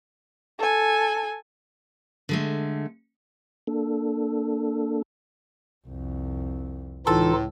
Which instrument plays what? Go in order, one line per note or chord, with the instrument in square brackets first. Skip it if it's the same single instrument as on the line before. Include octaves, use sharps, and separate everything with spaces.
[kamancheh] A4 G#5
[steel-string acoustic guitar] D3 G#3 A3
[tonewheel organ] A#3 D4 A4
[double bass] C2 F2
[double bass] C#2 [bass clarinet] A2 [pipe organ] E3 D#4 F4 [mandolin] A4